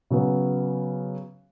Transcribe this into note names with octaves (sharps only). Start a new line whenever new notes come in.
C#3 F#3 B3